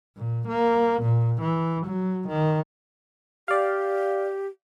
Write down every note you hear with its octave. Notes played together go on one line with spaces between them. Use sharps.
A#2
A#3
A#2
E3
F#3
D#3
G4 D5 F5